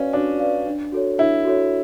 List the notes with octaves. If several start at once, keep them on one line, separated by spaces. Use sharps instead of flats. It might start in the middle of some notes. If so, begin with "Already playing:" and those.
Already playing: C#4 F#4 B4 D5 F5
D4 F#4
B4 D5 F5
D4
F#4 A4 C#5
D4 E4
F#4 A4 C#5